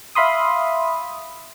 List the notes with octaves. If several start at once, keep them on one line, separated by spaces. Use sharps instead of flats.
E5 F5 B5 C6 D#6